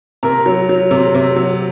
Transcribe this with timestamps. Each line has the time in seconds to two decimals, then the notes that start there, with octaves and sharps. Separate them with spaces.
0.23 C3 A#4 A#5
0.46 F#3
0.69 F#3
0.91 C3
1.14 C3
1.36 F#3